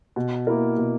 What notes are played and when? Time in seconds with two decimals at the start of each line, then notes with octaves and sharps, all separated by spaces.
0.16 B2
0.47 A#3 E4 A#4
0.77 B2